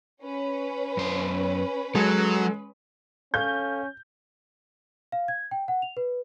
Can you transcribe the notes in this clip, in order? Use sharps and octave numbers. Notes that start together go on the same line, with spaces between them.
C#4 B4
F#2 C5
F#3 G#3 A4
C#4 A4 C#5 F5 G6
F5
G#6
G5
F#5
F7
B4